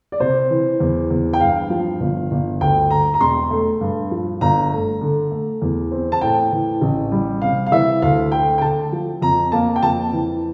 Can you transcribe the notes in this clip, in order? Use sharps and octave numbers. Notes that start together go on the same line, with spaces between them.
D5
C3 C5
E3
E2
E2
G5
G2 F5
F3
G1
G1
D2 G5
D3 A#5
A#5
E1 C6
A3
G2
F3
G1 A#5
A3
D3
A3
E2
C4
A5
A2 G5
E3
A1
G3
C3 F5
F5
E3 E5
D2 F5
A3 G5
G5
D3 A5
F3
F2 A#5
A#3 A5
G5
F2 A5
E3